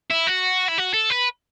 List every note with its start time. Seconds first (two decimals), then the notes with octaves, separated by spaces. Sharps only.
0.11 E4
0.27 F#4
0.69 E4
0.78 F#4
0.93 A4
1.10 B4